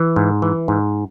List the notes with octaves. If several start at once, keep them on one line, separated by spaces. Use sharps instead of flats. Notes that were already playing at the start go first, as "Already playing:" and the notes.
Already playing: E3
G#2
E3
G#2